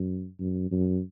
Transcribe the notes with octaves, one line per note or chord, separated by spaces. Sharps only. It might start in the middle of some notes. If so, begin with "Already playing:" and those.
Already playing: F#2
F#2
F#2